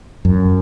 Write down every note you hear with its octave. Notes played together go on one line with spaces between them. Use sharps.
F#2